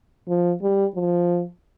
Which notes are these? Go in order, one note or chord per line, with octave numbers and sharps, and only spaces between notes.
F3
G3
F3